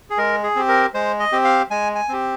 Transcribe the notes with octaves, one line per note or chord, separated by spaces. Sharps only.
G#4
G#3 A#4
G#4
C4 G4
A#4
G#3 C5
D#5
C4 G4
F5
G#3 G#5
G#5
C4 G4